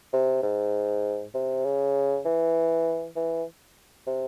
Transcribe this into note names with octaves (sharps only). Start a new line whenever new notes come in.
C3
G#2
C3
C#3
E3
E3
C3